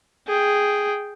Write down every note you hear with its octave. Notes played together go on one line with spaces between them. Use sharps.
G#4 G5